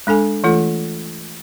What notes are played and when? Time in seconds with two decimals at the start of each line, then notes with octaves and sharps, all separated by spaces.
0.07 G#3 D4 A4 G#5
0.44 E3 A3 F4 A4